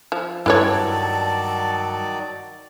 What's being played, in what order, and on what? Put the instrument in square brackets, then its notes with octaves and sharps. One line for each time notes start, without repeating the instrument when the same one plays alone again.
[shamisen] F3
[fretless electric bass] G2 [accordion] D#3 F#3 D5 [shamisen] E4 B4 C#5 [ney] A5